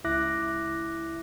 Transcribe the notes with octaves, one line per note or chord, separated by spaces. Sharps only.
C#2 E4 E5 D6 F#6 A#6